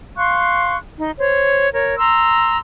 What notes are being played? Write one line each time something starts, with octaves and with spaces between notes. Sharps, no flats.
F5 C6 C#6 F#6
D#4
C5 C#5
A#4 C#5
A#5 C6 E6